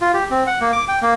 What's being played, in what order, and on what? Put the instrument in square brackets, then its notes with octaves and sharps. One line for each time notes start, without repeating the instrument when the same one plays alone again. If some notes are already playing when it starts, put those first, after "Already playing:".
[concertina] F4
G4
C4
F#5
A#3
D6
G5
A#3